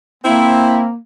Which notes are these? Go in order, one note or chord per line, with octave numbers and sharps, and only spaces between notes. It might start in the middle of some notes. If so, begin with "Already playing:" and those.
A#3 C4 E4